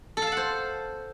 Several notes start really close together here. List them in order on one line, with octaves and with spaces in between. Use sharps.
A4 F5 A5 F#5 C5